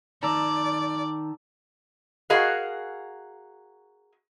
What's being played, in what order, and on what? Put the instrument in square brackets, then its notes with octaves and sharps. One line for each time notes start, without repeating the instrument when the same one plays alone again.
[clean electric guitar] D#3 [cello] D5 [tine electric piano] A5 A#5 E6
[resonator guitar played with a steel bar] F#4 G#4 A#4 D#5 F5